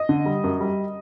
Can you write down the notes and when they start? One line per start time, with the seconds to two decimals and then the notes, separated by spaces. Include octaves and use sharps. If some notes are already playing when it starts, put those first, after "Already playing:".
Already playing: D#5
0.09 D3
0.26 G3
0.44 F#2
0.61 G3